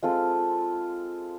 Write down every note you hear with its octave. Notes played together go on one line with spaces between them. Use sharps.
G#3 C4 F4 A4